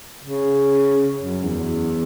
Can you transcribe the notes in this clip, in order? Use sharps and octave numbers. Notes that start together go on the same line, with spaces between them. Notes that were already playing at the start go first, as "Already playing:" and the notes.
C#3
F#2
E2